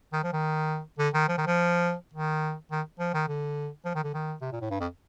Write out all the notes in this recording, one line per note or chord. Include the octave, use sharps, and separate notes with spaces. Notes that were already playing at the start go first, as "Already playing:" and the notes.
D#3
F3
D#3
D3
D#3
F3
D#3
F3
D#3
D#3
F3
D#3
D3
F3
D#3
D3
D#3
C3
A#2
A2
G2
F2